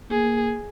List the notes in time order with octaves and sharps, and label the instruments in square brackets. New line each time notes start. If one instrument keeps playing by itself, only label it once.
[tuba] A#3 [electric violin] G#4